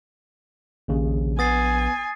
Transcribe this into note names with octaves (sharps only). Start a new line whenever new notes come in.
A#1 D#2 C#3
B3 G#5 D#6 A6 C7